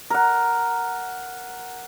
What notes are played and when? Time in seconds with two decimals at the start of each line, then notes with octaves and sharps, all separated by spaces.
0.10 A#4 F#5